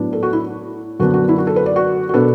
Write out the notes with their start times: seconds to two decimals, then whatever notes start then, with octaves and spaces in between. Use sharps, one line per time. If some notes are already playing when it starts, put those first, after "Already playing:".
Already playing: A2 F#3 B3 D4
0.13 A4
0.23 F#4
0.33 E4
1.00 F#2 D3 B3 D4 F#4
1.14 F#4
1.29 E4
1.38 F#4
1.47 A4
1.56 B4
1.66 D5
1.76 F#4
2.09 F#4
2.14 B2 B3 D4 A4